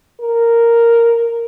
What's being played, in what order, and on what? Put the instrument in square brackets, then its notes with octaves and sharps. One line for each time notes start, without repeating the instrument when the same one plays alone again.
[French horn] A#4